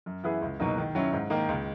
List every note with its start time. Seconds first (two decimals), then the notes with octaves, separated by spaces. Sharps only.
0.06 F#2
0.24 E3 B3 E4 G#4
0.42 C#2
0.60 B2 F#3 A#3 D#4
0.77 D#3
0.95 F#3 C#4 E4
1.13 G#2
1.30 D#3 A#3 D#4
1.49 C#2